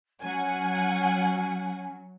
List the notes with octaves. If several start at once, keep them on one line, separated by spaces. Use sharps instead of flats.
F#3 C#4 F#5 G#5